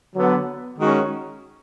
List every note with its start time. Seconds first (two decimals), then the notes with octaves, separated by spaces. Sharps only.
0.15 D3 F#3 B3
0.79 D#3 G#3 C#4 F#4